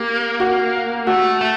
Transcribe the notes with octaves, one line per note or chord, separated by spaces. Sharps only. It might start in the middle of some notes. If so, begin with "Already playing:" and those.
Already playing: A#3 G4
F#4
A3 F#4
A3